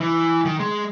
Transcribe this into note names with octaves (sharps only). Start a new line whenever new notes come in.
E3
D#3
G#3